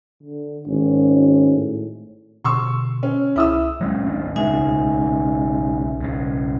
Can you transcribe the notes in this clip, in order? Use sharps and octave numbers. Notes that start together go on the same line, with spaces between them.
D3
G#1 C#4
A2
B2 D3 C6 C#6 E6
C#4
C2 E4 D#6 E6
F#3 G#3 C#4
G#1 C4 D4
B1 C#3 G#3 D#4 E5 G#5
B1 C#3